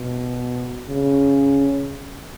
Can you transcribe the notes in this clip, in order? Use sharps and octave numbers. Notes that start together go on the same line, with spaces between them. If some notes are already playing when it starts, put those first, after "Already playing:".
Already playing: B2
C#3